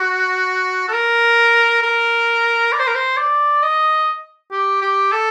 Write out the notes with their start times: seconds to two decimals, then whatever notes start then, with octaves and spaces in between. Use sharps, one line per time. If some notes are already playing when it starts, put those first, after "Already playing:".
Already playing: F#4
0.88 A4
0.93 A#4
1.83 A#4
2.72 D5
2.80 C5
2.87 A#4
2.94 C5
3.17 D5
3.63 D#5
4.52 G4
4.82 G4
5.12 A4